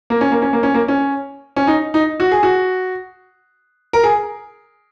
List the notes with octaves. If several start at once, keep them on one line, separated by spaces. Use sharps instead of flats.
A#3
C#4
A#3
C#4
A#3
C#4
A#3
C#4
C#4
D#4
D#4
F#4
G#4
F#4
A#4
G#4